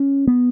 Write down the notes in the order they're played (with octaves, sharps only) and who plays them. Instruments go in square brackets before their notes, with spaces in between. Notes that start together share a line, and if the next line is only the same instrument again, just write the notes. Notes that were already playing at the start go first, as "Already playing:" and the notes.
Already playing: [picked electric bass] C#4
B3